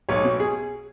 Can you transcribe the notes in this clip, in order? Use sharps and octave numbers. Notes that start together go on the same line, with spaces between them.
B1 C#5
B2
G#4